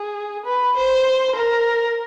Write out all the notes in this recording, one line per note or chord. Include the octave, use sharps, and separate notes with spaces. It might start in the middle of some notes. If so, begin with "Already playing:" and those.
Already playing: G#4
B4
C5
A#4